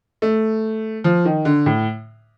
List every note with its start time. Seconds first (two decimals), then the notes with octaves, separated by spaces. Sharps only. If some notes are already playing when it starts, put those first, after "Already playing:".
0.22 A3
1.04 F3
1.25 D#3
1.45 D3
1.66 A2